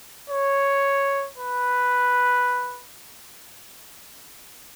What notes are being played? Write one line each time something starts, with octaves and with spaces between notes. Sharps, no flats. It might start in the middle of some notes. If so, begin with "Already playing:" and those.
C#5
B4